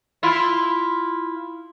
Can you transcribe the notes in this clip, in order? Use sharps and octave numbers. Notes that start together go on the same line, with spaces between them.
E4 F4